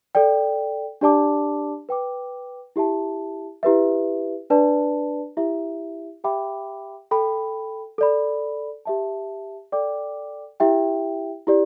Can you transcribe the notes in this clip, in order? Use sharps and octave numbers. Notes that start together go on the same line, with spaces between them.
A4 D5 G5
D4 G4 D5 A5 D6
B4 G5 D6
E4 G4 E5 A5
E4 G4 B4 E5
D4 B4 D5 A5
E4 G4 E5
G4 E5 G5 B5 D6
A4 G5 B5
A4 D5 B5
G4 E5 A5
A4 D5 G5 D6
E4 G4 E5 G5
E4 G4 D5